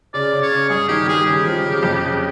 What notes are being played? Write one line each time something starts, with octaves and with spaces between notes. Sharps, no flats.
C#3 D5
C#3
C#5
C#3
G2 G#4
D#3 G4
G3 G#4
C#3 G4
F3
C#3
F2
C#3